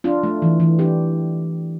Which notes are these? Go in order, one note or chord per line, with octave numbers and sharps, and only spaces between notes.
D4 F4
A3
E3
E3
D4 G4